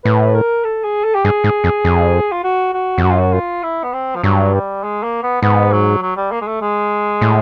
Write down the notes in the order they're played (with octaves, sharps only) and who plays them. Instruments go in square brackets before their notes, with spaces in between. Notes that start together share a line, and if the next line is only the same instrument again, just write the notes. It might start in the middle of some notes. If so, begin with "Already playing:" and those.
[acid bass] A2 [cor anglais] B4
[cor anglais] A#4
A4
G#4
A4
G4
[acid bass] G2 [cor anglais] G#4
[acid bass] G#2
F2
F2
[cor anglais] F4
F#4
F#4
[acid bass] F2
[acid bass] F#2 [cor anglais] F#4
[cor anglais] F4
F#4
F4
E4
B3
C4
F3
[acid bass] G2 [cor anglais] F#3
[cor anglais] G3
G#3
A#3
B3
[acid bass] G#2 [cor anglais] B3
[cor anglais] F#3
F#3
G3
A#3
G#3
A3
G#3
[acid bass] A2